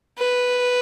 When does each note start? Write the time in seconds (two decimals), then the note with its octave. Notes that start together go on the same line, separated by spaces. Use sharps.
0.18 B4